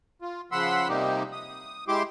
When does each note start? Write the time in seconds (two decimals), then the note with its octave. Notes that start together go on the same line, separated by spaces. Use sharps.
0.22 F4
0.52 C#3 F3 F#5 B5 C6 E6
0.88 C3 G3 A#3 D#4 G4
1.32 D#6
1.88 G#3 E4 G4 C6 D6